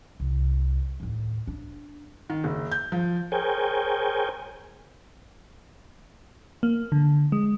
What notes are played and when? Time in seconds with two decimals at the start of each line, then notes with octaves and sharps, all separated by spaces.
0.20 C2
1.00 D#2 A2
1.47 D4
2.30 D#3
2.44 F#1
2.72 G6
2.92 F3
3.32 G#4 A#4 C5 C#5 G5 G#5
6.63 A#3
6.92 D3
7.32 G#3